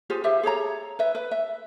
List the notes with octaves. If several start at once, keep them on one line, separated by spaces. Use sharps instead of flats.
F4 G4 G#4 C5
G4 C5 E5 F5
G#4 A4 C#5 A#5
B4 E5
B4
E5